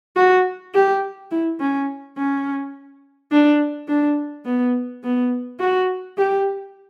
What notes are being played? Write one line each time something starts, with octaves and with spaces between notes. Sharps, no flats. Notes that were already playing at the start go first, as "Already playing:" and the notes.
F#4
G4
E4
C#4
C#4
D4
D4
B3
B3
F#4
G4